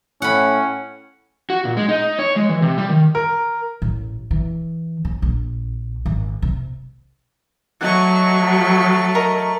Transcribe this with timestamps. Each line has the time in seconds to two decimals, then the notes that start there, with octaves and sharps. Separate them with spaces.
0.22 A2 C#4 F#5 B5
1.50 F#4
1.65 A#2
1.77 G#3
1.88 D#4
2.19 C#5
2.36 G#3
2.49 E3
2.62 C3
2.78 G3
2.89 D#3
3.15 A#4
3.82 A1
4.31 E3
5.05 C#3
5.22 A#1
6.06 G#1
6.42 C3
7.81 F#3 A3 D#5 F#5 C#6
9.15 A#4 D#5